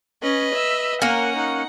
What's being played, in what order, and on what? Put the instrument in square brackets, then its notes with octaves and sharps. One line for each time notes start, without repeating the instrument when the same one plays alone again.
[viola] C#4 [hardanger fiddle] B4 D#5
[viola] E5
[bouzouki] A#3 C#4 [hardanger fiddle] A#4 G#5 [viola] F#5
[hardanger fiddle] D#4